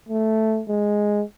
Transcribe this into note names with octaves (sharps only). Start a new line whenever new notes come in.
A3
G#3